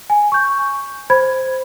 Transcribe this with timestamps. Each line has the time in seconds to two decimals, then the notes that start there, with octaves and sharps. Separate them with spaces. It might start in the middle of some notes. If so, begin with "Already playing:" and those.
0.10 G#5
0.32 C#6 G6
1.10 C5 B5 G#6